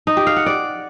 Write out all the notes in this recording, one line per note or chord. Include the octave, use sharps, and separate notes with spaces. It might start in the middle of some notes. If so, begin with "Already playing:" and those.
D#4
G4
F5
F#5
D5